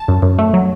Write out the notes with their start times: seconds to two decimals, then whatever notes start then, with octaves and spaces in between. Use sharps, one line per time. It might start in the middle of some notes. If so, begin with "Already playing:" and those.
Already playing: A5
0.08 F#2
0.22 F#2
0.39 A3
0.54 F#3